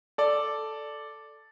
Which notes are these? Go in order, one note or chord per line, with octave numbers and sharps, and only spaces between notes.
A4 D5